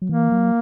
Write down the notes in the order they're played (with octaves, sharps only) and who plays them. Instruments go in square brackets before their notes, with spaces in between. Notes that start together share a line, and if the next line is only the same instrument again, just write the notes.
[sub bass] F#3
[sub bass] E3 [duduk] A#3
[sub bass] F#3